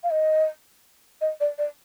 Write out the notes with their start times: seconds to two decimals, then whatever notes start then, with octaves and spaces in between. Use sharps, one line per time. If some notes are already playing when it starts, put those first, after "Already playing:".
0.04 F5
0.11 D#5
1.21 D#5
1.40 D5
1.58 D5